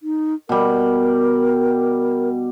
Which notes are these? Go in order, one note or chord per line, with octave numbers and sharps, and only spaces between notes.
D#4
B2 G3 A#4